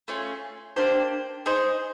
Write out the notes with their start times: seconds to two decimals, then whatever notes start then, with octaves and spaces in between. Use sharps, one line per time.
0.08 A3 C#4 F4 G#4
0.76 A#3 D4 G4 C5
1.46 D#4 G#4 C5